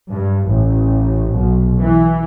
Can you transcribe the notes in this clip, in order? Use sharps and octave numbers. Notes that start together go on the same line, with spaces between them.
G2
A1
B1
E3